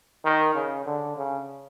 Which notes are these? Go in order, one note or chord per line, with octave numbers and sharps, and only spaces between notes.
D#3
C#3
D3
C#3